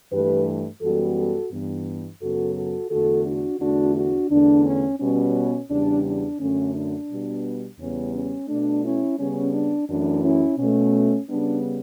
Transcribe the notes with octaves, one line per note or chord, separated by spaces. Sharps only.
G2 E3 A3 G4 B4
F#2 E3 G3 B3 F#4 A4
F#4 A4
G2 E3 B3
F#2 C#3 F#3 B3 F#4 A4
F#4 A4
E2 D3 A3 F#4 A4
D4 F#4
E2 D3 A3 D4 F#4
D4 F#4
E2 D3 A3 D4
C#4
B2 G3 B3 C#4
E2 C#3 G3 D4
D4
F#2 D3 A3 C#4
D4
B2 G3 B3
E2 C#3 G3 B3 C#4
C#4
B2 A3 D4
C#4 E4
C#3 G3 B3 C#4
D4
F#2 E3 A3 D4
C#4 E4
B2 A3 C#4
C#3 G3 B3 D4